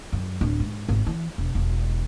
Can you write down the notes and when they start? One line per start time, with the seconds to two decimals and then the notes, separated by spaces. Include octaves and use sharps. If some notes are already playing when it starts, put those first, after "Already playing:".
0.13 F#2
0.41 D1
0.60 G#2
0.89 G#1
1.07 E3
1.38 E1
1.55 E1